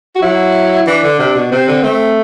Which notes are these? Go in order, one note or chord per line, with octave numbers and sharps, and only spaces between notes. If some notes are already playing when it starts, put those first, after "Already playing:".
F#4
F#3 E4
E3 D4
D3
C3
B2
C3 C4
D3
A3 C4